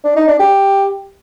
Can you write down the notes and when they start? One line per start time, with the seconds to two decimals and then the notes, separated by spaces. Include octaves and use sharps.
0.04 D4
0.16 D#4
0.28 D4
0.39 G4